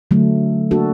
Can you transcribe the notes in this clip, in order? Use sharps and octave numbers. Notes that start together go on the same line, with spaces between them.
D3 F#3 A3
A#3 D4 F#4 A4